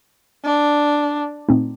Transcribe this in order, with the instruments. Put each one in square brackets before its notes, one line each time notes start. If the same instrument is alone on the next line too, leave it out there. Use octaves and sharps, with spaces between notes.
[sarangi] D4
[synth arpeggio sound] A#2 A3 C4 D#4